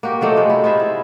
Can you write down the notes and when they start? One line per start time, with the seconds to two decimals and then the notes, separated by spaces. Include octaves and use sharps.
0.03 A#3 F#4 G4
0.21 F3 F#3 A3 D#4
0.36 C3 G#3
0.49 E4
0.64 D#4 F4 G#4 E5
0.80 E4